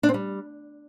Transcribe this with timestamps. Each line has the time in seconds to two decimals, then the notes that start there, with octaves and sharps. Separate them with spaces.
0.03 D4
0.09 C4
0.14 G3